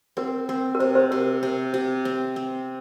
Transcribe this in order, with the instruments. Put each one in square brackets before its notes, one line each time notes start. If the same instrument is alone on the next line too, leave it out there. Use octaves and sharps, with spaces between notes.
[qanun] C4 [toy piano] A#4
[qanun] C4
[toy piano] A#4
[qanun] C3 [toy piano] C5
[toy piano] C5
[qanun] C3 [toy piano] A#4
[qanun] C3
C3
C4
C4